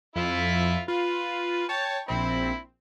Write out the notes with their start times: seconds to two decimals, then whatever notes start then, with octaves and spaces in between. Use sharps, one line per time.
0.16 F2 E4 F4 E5
0.88 F4 B4
1.69 C#5 G5 A5
2.08 A#1 C4 E4 B5